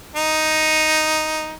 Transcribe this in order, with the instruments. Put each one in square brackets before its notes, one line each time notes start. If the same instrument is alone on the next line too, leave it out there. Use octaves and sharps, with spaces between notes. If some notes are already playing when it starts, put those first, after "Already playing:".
[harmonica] D#4